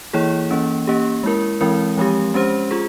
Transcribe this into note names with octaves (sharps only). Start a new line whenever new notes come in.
E3 A#3 E4 G#4 C#5
E3 A#3 C#4
A#3 C#4 G4
G#3 E4 A#4
E3 G#3 C4 E4 A#4
F3 G#3 C4 G4
G#3 C#4 G4 C5
F4 G#4